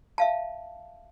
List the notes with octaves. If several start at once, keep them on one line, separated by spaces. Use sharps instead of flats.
E5 F5 A5